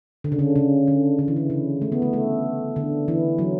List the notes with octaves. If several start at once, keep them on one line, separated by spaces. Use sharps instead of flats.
D3
C#3
D3
C#3
D3
D3
E3
D3
C#3
A3
B3
A3
A3
D3
E3
F#3